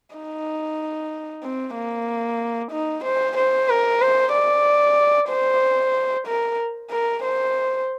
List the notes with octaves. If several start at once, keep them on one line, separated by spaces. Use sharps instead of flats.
D#4
C4
A#3
D#4
C5
C5
A#4
C5
D5
C5
A#4
A#4
C5